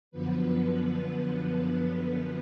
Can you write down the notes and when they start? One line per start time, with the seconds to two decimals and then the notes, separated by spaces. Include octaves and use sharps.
0.11 F#2 D3 F3 B3 B4
0.61 B3 B4
1.63 B3 B4